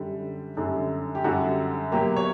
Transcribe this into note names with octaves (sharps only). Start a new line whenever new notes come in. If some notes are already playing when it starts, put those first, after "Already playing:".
Already playing: F#2 D3 G3
F#2 D3 G3
G4
F#2 D3 G3 F#4
B2 F#3 A#3 G4
C#5